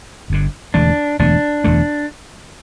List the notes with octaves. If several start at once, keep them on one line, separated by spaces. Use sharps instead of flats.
G1 G2 D3
E1 E2 D3 A3 D4
E1 E2 D3 A3 D4
E1 E2 D3 A3